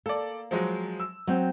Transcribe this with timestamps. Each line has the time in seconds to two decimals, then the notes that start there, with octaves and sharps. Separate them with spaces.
0.06 A#3 A4 D5
0.51 F3 F#3 G#3
1.00 E6
1.27 F#3 C4 G5